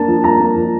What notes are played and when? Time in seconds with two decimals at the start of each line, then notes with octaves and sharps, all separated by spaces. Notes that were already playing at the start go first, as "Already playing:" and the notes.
Already playing: A#3 D4 A5
0.08 F3
0.24 A#3 A#5
0.40 A#3
0.56 F3